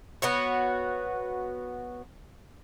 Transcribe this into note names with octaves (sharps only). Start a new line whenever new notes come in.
B3 F#4 C#5